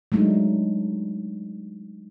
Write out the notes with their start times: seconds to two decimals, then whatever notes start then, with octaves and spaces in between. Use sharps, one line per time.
0.12 F#3 G#3 A3 D4 D#4